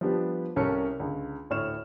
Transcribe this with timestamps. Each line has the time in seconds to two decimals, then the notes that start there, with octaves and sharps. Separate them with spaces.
0.01 F3 G3 B3 D4 G4
0.56 C2 C#4 A4 A#4 A5 C#7
1.00 C#2 D3
1.50 D2 A2 C#5 F6 E7